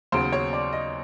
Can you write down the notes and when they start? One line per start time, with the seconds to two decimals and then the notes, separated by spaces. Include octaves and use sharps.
0.12 D#2 C#3 F#3 B3 C5
0.32 C#5
0.53 D5
0.73 D#5